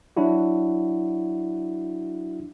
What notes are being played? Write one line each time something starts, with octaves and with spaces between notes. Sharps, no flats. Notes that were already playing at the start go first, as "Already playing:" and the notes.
F#3 D4 E4 F#4